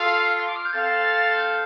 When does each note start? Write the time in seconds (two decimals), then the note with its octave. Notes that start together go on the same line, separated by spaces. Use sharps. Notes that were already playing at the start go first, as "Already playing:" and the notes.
Already playing: F4 A4 F5 C7
0.40 C6
0.48 D6
0.56 F6
0.65 G6
0.73 C4 A4 F5 A6
1.38 G6